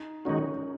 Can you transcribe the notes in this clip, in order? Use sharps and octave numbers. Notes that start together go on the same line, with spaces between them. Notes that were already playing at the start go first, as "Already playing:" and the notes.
Already playing: D#4
D#3 G#3 C#4 D#4 F#4